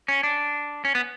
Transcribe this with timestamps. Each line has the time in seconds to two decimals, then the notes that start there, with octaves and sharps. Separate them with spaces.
0.08 C#4
0.23 D4
0.85 C#4
0.95 B3